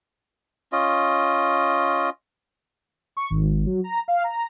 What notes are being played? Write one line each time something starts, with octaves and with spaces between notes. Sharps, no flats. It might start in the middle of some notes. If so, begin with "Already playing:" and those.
C#4 F4 D#5
C#6
G#1
F#3
A#5
F5
A#5